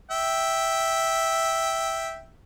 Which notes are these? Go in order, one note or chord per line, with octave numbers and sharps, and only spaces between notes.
E5 G5